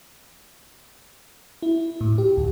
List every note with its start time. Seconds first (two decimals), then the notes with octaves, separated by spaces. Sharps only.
1.62 E4
2.01 A2
2.18 G4
2.37 D2